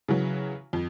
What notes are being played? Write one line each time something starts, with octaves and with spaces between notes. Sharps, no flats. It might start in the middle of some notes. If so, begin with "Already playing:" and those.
C#3 E3 F#3
F2